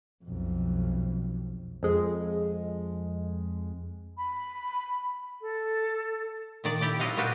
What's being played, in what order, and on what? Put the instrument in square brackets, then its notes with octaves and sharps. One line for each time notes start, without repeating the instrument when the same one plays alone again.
[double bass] B1 F2
[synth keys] F2 G#3
[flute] B5
A4
[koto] A#2 D#3 D5
E4 G4 D5
F#3 E4 F4 D#5 F5 F#5
A#2 G3 F4 F#4 B4 G5